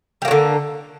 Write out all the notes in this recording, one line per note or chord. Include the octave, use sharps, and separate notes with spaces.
D3 F#3 G3 A#3